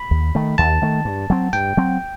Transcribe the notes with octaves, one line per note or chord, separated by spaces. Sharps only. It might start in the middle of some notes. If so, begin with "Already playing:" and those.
Already playing: B5
D#2
D#3 A3
D#2 A5
D#3 A3
G2
F#3 C4
G2 G5
F#3 C4